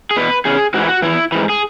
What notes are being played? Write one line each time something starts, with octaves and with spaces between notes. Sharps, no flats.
G#4
E2 B2 B4
E2 C#3 G#4
G#2 E3 E4 F#4
F#4
E2 C#3 E3 E4
G#2 E3
G#4